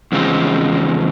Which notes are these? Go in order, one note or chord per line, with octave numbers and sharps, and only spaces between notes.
E2 C#3 F3 G#3 C4